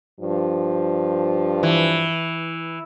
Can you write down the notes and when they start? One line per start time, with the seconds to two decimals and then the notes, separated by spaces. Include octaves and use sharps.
0.20 G2 F3
1.63 E3